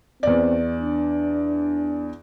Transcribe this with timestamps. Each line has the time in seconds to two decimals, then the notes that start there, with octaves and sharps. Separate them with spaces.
0.23 E2 C4 D5
0.80 D4